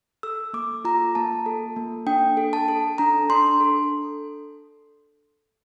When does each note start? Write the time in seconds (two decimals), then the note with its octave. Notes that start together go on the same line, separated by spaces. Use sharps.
0.23 A4 E6
0.53 A#3 D6
0.85 F4 A#5
1.15 A#3 A5
1.46 A4
1.76 A#3
2.07 D4 G5
2.37 A4
2.53 A5
2.68 A4
2.98 D4 A#5
3.30 D4 C6
3.60 A4